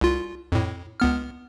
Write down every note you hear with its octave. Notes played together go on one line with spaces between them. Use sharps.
C2 F4
F2 A2
C#2 B3 F6